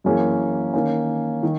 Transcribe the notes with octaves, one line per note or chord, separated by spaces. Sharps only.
F#2 E3 A#3 C#4 G#4
D#3 A#3 C#4
D#3